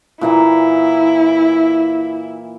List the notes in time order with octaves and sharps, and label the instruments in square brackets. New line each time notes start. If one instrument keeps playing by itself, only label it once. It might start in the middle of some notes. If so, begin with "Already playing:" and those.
[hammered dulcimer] A#2 E3 A#3 [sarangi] E4